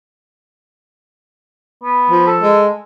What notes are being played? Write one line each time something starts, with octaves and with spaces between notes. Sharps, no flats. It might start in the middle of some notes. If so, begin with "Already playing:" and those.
B3
F3
A4
G#3